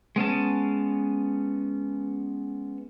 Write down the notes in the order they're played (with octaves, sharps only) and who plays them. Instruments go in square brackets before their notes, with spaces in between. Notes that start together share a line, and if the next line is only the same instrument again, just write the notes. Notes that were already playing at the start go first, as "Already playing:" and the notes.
[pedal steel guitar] G#3 B3 C#4 A5